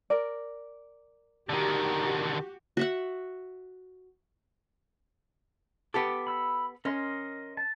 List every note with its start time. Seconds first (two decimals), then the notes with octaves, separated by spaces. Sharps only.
0.10 A#4 D5
1.49 D3 D#3 F#4 G4
2.77 F#4 E5 F#5
5.94 B3 G4 A4 D6
6.27 B5 E6
6.85 C#4 A#4 D#5 C6
7.57 A5